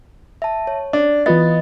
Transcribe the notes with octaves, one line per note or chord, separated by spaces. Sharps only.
E5 A5
C#5
D4 D5
E3 B3 F4 D#5 A6